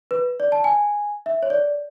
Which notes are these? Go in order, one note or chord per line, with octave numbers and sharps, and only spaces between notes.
B4
D5
A5
G#5
E5
C#5
D5